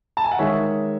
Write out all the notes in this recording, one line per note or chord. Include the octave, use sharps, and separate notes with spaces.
A5
G#5
F#5
D#3 G#3 C#5 E5